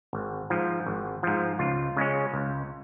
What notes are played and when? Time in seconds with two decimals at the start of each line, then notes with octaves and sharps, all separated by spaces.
0.13 G#1
0.50 G#2 F3
0.86 G#1
1.23 G#2 F3
1.59 C#2 F4
1.97 C#3 G#3 C#4
2.34 C#2